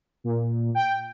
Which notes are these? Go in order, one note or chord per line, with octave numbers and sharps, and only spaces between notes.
A#2
G5